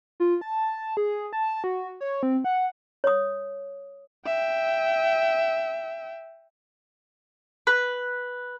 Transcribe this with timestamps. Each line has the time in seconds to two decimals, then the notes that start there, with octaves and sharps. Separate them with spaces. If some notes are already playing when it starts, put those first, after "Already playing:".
0.20 F4
0.41 A5
0.97 G#4
1.33 A5
1.64 F#4
2.01 C#5
2.23 C4
2.44 F#5
3.04 C#5 D#6
4.26 E5 G5
7.67 B4